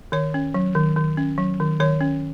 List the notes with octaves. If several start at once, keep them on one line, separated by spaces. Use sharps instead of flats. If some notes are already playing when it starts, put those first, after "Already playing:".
D#3 C#5
C#4
F#3
D#3
D#3
C#4
F#3
D#3
D#3 C#5
C#4